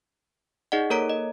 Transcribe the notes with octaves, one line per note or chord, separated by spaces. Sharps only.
D#4 G#4 D5 D#5 F#5
A#3 A4 A#4 C#5 A#5 D7
D#5